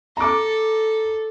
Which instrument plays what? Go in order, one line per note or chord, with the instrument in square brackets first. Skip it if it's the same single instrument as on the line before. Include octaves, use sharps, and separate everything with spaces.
[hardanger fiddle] A4 [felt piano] A#5 D6